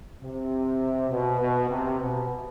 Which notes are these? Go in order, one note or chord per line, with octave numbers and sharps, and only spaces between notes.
C3
B2
B2
C3
B2